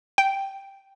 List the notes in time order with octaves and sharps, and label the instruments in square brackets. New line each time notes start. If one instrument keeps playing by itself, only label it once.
[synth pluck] G5